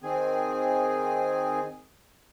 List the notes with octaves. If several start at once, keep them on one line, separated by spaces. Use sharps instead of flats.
D#3 C4 G#4 G#5